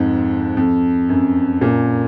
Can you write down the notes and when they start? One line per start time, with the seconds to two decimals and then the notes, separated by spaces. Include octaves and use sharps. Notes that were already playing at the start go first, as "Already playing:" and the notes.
Already playing: F2 G#2
0.57 F2
1.09 F#2
1.61 F#2 A#2